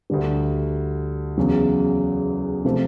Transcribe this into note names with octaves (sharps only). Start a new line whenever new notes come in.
D2 D3 G3
E2 C#3 F#3
C3 F3 A3